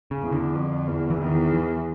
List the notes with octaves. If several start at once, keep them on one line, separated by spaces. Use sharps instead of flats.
C#3
E2
D3
F2
E2
E3
E2 D#3
E3